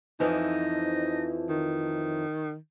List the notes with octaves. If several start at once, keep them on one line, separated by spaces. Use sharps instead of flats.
F2 E3 F3 D#4
D#3